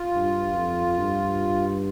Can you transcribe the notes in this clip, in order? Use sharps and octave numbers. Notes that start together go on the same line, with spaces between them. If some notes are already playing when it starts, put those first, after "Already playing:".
Already playing: F4
G2
F2
G2